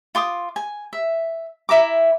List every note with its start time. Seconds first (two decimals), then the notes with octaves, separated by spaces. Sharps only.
0.15 F4 C6 D6 D#6
0.56 G#5
0.93 E5
1.69 E4 E5 A#5 D6